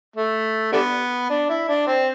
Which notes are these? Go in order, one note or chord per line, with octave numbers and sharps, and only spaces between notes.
A3
D3 G3 B3
D4
E4
D4
C4